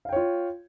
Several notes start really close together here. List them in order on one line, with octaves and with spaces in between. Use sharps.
F5 G5 C#5 F4